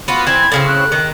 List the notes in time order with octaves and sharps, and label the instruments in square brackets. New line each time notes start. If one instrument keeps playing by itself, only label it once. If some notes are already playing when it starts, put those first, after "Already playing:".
[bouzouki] B3 F4 F#4
[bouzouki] E3 C4 [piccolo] G#6
[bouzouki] A2 C#3 C4
[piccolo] F#6
[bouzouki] D#3